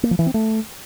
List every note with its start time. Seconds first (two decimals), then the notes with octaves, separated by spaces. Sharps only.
0.03 A#3
0.11 F3
0.19 E3
0.26 C4
0.34 A3